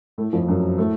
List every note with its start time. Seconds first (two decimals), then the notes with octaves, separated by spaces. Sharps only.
0.18 A2 A3
0.33 F2 F3
0.48 F#2 F#3
0.78 A2 A3